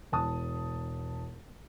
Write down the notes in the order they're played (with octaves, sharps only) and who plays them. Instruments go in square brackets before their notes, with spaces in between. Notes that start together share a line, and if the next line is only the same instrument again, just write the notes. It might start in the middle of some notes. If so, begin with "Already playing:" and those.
[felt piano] E1 A5 D#6